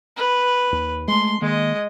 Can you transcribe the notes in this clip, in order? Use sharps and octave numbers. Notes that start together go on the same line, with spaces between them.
B4
D#2
G#3 A3 C6
D#3 G#3 A#3 D#5